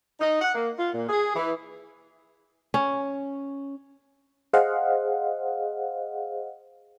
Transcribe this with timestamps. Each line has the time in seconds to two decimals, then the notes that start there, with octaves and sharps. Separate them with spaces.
0.21 D#4
0.41 F#5
0.54 A#3
0.78 F4
0.94 A#2
1.09 G#4
1.35 E3
2.74 C#4
4.53 G#4 C5 D#5 F5 F#5